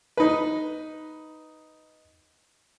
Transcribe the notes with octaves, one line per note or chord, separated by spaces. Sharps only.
D#4 B4